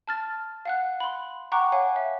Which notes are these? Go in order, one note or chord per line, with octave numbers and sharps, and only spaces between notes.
A5 F6 A6
F5 F#5 F#6
B5 C6
F#5 G5 A#5 C#6 D6 F#6
C#5 F5 F#5 G#5
E5